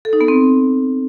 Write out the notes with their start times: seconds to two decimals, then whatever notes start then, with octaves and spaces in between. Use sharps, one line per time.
0.05 A4
0.13 D#4
0.21 B3
0.28 C4